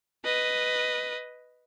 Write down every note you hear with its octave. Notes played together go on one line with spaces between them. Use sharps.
B4 D#5